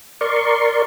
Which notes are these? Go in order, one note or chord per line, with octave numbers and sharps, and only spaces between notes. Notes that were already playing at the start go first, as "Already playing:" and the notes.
A#4 D5 C6 C#6